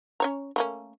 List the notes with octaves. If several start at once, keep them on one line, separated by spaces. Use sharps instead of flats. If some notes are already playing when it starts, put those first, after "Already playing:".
C#4 C#5 A#5
A3 A#3 C#4